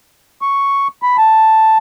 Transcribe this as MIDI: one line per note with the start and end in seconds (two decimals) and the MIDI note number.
0.42 0.88 85
1.03 1.17 83
1.18 1.78 81